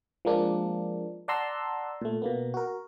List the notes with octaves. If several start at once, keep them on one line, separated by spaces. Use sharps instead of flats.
F3 G#3 A#3 D4
D5 F#5 A5 A#5 C6 E6
A#2 A3
B2 A#3 B3
F#4 A#4